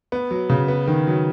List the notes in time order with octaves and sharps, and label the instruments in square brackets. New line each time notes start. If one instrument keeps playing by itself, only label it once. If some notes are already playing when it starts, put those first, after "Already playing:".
[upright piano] B3
F#3
C#3
B3
D#3
F#3